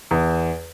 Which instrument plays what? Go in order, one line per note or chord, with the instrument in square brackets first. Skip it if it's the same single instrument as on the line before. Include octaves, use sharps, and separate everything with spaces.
[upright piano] E2